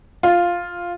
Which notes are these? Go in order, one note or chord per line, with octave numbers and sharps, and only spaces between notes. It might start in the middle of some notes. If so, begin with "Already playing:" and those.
F4